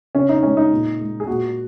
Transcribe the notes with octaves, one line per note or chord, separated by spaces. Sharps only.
C#3 C#4
D#4
G#3 C#4
D#4
A#2
G#3
G#4
A#2 F#4